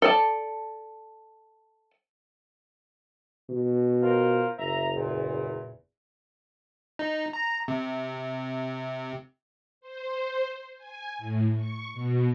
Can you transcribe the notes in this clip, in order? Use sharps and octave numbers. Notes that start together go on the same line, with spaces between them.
A4 D5 A5
B2
F4 A#4 C5
F#1 E5 A#5
E2 A#2
D#4
A#5
C3
C5
G#5
A2
C#6
B2